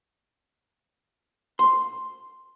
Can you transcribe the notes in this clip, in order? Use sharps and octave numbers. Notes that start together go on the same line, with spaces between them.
C6